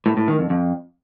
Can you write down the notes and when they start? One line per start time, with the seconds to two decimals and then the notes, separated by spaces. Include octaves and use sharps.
0.06 A2
0.17 A2
0.28 D#3
0.39 F2
0.50 F2